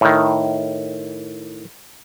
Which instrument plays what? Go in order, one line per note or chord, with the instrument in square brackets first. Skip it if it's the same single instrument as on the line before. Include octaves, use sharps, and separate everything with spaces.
[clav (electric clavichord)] A2 D#3